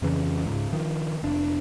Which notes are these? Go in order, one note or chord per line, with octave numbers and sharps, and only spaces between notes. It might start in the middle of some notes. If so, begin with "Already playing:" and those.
F2 C#3 E3 C#4
C#2 G#2
D#3 F3
F1 D4